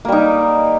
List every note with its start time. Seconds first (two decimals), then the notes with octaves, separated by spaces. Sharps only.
0.05 A#3
0.08 G3
0.12 D#4